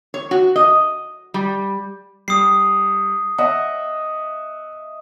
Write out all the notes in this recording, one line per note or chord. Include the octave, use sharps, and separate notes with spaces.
C#5
F#4
D#5
G3
G3 D#6 C7
D#5 E5 F#5